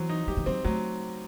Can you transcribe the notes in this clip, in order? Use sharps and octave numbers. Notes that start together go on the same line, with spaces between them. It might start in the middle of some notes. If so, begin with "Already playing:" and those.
Already playing: E3 F#3 C4
D#4
F#3 G4
E3
F#3 C4
F#3 A3